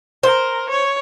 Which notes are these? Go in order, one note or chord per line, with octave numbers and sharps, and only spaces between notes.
A#4 C5
C#5